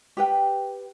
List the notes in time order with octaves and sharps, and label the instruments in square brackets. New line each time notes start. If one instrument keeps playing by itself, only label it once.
[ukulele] G4 B4 G5